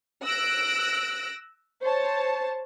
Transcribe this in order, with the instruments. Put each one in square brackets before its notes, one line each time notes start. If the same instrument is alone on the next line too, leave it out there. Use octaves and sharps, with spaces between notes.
[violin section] E6 F#6 A#6 D7
C5 C#5 A5